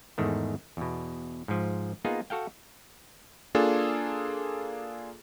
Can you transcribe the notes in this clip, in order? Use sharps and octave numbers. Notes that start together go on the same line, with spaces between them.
E2 G#2 D#3 A3
E2 B2
G#2 F3
A#3 B3 D#4 F4 G#4
F#4 A4 F5 G5
A#3 D4 F4 G#4 A4